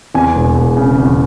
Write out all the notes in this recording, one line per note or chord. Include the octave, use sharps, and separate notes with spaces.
E2 G#5
E1
E1
C#3
E2